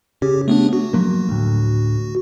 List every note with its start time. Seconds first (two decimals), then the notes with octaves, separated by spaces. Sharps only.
0.22 C#3 G4
0.48 A3 B3 D4
0.73 F#4
0.93 F3 F#3 A#3
1.29 D2 A2